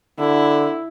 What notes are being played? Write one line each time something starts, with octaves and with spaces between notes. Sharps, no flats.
D3 E4